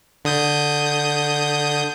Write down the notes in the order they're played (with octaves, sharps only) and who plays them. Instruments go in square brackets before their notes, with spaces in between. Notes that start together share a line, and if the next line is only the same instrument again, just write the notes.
[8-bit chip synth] D3 D#6 G6